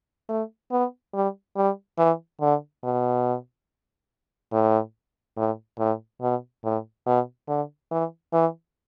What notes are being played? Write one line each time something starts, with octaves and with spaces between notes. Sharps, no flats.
A3
B3
G3
G3
E3
D3
B2
A2
A2
A2
B2
A2
B2
D3
E3
E3